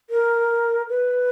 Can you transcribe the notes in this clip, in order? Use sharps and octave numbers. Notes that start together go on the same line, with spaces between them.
A#4
B4